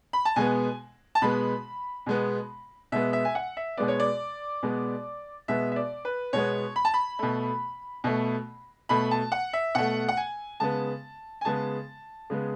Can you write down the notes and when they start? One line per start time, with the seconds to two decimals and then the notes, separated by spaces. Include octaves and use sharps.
0.13 B5
0.25 A5
0.36 B2 G#3 B3 G#5
1.15 A5
1.22 B2 G#3 B3 B5
2.06 B2 G#3 B3
2.92 B2 G#3 B3 E5
3.13 E5
3.25 G#5
3.35 F#5
3.57 E5
3.77 B2 G#3 B3 D5
3.88 C#5
4.00 D5
4.63 B2 G#3 B3
5.48 B2 G#3 B3 E5
5.72 E5
5.76 D5
6.05 B4
6.33 B2 G#3 B3 C#5
6.76 B5
6.85 A5
6.94 B5
7.19 B2 A3
8.04 B2 A3
8.89 B2 A3 B5
9.11 A5
9.32 F#5
9.53 E5
9.75 B2 A3 F#5
10.08 F#5
10.17 G#5
10.60 C#3 G#3 B3 A5
11.41 G#5
11.45 C#3 G#3 B3 A5
12.30 C#3 G#3 B3